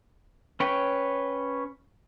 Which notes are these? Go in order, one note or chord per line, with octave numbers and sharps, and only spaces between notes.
C#4 B4 C#5 G5